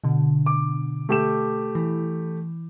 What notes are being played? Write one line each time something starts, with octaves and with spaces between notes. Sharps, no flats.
B2 D3
D6
A3 G4 E7
E3